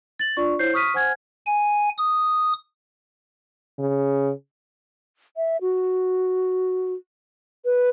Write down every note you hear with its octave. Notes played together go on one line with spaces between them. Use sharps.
A6 F#7
D4 F4 D5 C#6
E4 C5 C#5 G6 C7
C#6 D#6 F6 B6 D#7
C5 F#5 G#5 F6 G#6
G#5
D#6
C#3
E5
F#4
B4